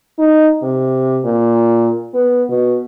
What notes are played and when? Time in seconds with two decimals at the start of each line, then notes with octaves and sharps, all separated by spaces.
0.19 D#4
0.62 C3
1.25 A#2
2.14 B3
2.49 B2